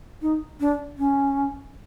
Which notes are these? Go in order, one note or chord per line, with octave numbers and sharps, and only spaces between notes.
D#4
D4
C#4